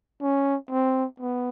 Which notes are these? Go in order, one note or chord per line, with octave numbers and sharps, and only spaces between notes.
C#4
C4
B3